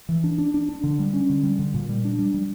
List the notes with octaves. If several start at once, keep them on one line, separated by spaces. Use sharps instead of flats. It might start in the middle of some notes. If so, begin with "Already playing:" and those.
E3
D4
D4
D4
D4
D3
G3
C#4
D3
G3
D3
A#2
G3
D4
G3
G3